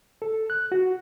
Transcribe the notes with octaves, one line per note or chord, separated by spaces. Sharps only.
A4
F#6
F#4